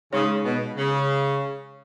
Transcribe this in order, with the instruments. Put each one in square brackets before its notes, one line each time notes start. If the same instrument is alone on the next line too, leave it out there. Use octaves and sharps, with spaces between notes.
[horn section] C#3 [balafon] G#3 D#4 G#4 C#5
[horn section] B2
C#3